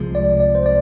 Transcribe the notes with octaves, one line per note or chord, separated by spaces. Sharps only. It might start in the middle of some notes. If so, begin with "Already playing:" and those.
Already playing: C2 C3 F3 G#3
D5
D5
C5
D5